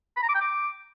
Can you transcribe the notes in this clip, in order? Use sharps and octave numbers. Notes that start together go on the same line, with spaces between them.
B5
A#5
D6
G5
D6